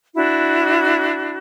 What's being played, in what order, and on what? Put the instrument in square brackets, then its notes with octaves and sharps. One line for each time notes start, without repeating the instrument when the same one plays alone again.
[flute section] D4 E4 F#4